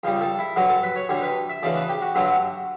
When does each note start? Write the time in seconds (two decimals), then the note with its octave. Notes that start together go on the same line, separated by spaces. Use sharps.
0.04 C#2 C#3 G3
0.21 A4
0.39 E4
0.56 G2 D3 F#3 F#4
0.69 A4
0.83 B4
0.96 C#5
1.09 D2 D3 G3 C#5
1.22 B4
1.49 E5
1.63 D2 C#3 E3 A3 D5
1.76 B4
1.89 G4
2.02 F#4
2.15 G2 D3 F#3 A3